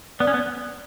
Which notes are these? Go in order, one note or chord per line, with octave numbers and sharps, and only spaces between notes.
B3 D5
C#4
B3